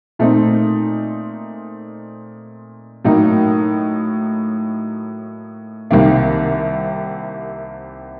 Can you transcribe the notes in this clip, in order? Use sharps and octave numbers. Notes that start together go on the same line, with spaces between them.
A#2 A3 C4 D#4
A2 F#3 A#3 D#4
C2 C3 D#3 A#3